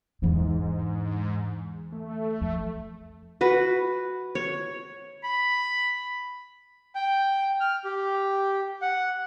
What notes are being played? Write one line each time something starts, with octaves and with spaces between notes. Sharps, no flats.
E2 G#2 D3
A3
F2
F#4 B4
C#5
B5
G5
F6
G4
F#5